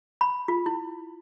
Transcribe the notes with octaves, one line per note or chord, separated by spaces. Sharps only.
B5
F4
E4